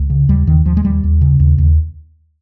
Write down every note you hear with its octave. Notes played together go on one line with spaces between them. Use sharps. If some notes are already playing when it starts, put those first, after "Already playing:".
Already playing: C#2
C#3
D#2 G3
D#2 D#3
D#2 F3
G#3
D#2 G3
D#2
C#3
D#2
D#2